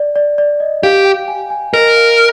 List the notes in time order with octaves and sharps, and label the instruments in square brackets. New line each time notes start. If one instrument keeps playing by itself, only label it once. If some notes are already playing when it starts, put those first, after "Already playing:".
Already playing: [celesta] D5
D5
D5
D#5
[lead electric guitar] G4 [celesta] F5
[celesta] G5
G#5
G#5
[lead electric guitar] A#4 [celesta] D#5
[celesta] F5